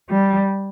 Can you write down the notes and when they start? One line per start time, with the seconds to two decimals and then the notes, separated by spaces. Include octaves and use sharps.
0.09 G3